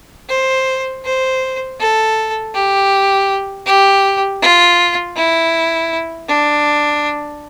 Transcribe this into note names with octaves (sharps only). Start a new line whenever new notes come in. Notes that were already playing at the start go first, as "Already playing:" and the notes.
C5
C5
A4
G4
G4
F4
E4
D4